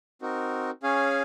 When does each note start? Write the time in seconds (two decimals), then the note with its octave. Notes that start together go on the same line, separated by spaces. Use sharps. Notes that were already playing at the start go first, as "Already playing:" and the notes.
0.22 C4 D#4 F#4 A#4
0.83 C#4 G#4 C#5 F5 G#5